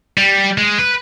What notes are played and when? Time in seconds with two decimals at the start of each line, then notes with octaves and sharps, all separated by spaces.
0.18 G3
0.58 G#3
0.78 B4